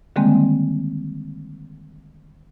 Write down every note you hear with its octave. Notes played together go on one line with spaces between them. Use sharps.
D3 D#3 G3 G#3 A#3 C4